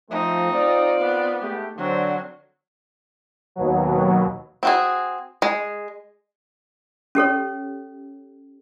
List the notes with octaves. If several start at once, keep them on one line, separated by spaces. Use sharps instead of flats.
F3 A3 C4 D#4
C4 F4 D5
B3
G#3 A3 G4
D3 F#3 C4
D#2 B2 F#3
C4 F#4 G#4
G#3
C#4 G4 A4 C#5